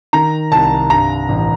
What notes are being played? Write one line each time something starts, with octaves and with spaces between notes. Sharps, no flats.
D#3 A#5
C2 A5
G2 A#5
A1